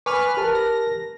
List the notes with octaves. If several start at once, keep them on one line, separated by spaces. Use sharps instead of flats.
B4 G#5 C#6 D6 F6
G4 A#4 A5
A#6